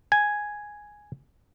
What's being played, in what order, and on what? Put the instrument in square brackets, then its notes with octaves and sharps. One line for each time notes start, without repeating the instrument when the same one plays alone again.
[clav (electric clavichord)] G#5